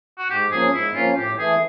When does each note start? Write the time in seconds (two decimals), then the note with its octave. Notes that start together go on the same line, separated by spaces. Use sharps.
0.19 F#4
0.30 G#2 G4
0.52 F3 A#3 C#4 G#4
0.73 G#2 E4
0.95 F3 A#3 C#4 F4
1.17 A2 G4
1.38 E3 A3 G#4